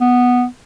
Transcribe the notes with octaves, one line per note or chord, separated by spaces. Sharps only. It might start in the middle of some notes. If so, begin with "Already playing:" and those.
B3